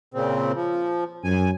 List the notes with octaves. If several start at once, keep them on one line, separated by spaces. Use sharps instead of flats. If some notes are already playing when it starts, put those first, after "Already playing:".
A#2 C#3 C4
F3
F#2 G#5